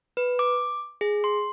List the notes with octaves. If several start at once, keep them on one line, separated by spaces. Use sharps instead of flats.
B4
D6
G#4
C6